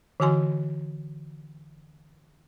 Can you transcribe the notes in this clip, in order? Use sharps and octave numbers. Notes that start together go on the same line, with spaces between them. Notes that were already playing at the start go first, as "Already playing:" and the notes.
D3 E3 F#4 G#5 C6